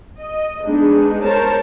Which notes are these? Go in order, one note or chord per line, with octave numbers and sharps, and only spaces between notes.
D#5
G#3 B3 D4 D#4 G#4
A#4 C5 C#5 A5 A#5